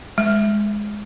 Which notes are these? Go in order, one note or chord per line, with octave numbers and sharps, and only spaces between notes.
G#3